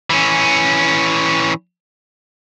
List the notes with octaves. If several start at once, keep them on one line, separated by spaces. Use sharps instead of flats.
E3 C#4